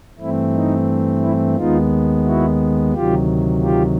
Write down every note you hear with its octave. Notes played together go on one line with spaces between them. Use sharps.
G2 E3 A3 C4 E4
D#4
E4
D#2 D#3 G#3 B3 D#4 F4
E4 F#4
D2 C3 D#3 F#3 F4 G4
F4 G4